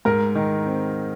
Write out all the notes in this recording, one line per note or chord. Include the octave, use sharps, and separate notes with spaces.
G#2 A#4
D#3
C4